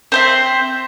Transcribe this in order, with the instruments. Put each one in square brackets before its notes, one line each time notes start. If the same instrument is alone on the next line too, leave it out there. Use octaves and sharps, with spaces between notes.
[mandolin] C4 C5 E5